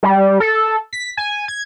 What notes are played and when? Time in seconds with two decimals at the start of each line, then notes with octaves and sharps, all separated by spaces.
0.03 G3
0.40 A4
0.93 B6
1.17 G#5
1.48 G#6